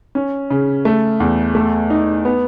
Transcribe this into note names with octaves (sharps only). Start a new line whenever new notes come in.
C#4
C#3
A3
E2
A3
D#4
B3